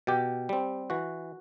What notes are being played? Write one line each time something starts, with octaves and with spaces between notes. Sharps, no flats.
B2 G4
G3 C4
E3 F#4